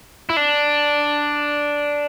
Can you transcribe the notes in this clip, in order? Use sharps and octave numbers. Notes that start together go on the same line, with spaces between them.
E4
D4